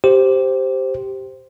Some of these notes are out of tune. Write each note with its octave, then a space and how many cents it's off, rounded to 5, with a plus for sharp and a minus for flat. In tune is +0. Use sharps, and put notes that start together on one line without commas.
G4 -5 C5 +0